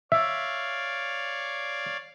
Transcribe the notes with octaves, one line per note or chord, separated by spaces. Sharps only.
C#5 D5 E5 F5